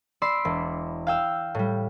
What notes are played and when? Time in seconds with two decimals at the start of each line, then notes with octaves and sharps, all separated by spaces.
0.22 D5 B5 C6 D6 E6
0.45 E1
1.07 F5 G5 E6
1.55 A2 G3